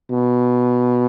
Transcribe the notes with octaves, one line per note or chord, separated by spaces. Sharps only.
B2